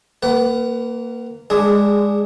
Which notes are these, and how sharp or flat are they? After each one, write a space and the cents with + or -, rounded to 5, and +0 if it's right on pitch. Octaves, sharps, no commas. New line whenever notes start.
A#3 -15 B4 +20 F#5 +25
G#3 -20 D4 +0 G#4 +0